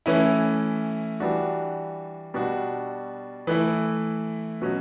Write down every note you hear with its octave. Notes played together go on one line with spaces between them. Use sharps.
E3 A3 C#4 E4
E3 G3 D4 F#4
B2 G3 D4 F#4
E3 A3 E4
B2 F#3 C#4 F#4